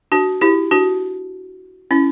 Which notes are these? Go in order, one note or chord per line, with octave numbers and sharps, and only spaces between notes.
D4 F#4
E4 G4
D4 F#4
C#4 E4